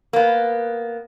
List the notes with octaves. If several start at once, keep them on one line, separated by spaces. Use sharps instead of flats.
A#3 B3